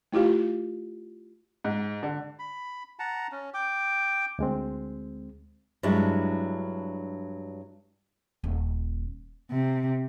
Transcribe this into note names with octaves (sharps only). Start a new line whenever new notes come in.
A3 E4 F4 G4 F5
G#2
D3
B5
F#5 A5 A#5
C#4
G5 D6
D2 G#3 C4
G2 F#3 G#3 D4 E4
D#1
C3